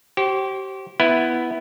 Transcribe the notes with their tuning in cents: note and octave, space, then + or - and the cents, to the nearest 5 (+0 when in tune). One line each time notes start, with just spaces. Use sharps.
G4 -30 C5 +30
B3 +0 E4 +0